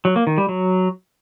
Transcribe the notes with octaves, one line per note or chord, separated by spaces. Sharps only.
F#3
A#3
D#3
G3
F#3